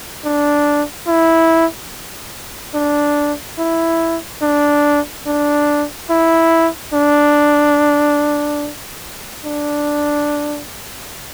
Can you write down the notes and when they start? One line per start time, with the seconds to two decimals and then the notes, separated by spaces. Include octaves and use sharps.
0.24 D4
1.07 E4
2.74 D4
3.58 E4
4.42 D4
5.26 D4
6.10 E4
6.93 D4
9.44 D4